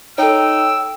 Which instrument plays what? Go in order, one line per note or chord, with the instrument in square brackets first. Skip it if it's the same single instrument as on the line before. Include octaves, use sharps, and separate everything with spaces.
[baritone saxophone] D#4 [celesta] A4 C#5 [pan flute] G5 [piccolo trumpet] E6